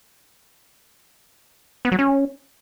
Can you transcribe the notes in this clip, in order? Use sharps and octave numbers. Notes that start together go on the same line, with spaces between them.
B3
F#3
C#4